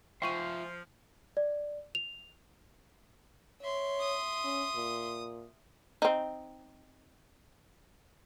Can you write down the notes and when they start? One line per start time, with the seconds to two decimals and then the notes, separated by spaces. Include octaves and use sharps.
0.22 F3 F4 C5 E5 G5 C6 C#6 D#7
1.37 D5
1.95 F7
3.61 C#5 E5 C6
4.00 D#6
4.44 C#4
4.75 A#2
6.02 C4 D#4